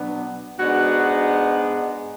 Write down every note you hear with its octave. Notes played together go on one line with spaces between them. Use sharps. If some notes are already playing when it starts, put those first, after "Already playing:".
Already playing: B2 F#3 B3 D4
G#2 G#3 B3 D4 F#4